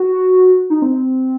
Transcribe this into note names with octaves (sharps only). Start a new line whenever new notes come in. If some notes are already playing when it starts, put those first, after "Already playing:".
Already playing: F#4
D#4
C4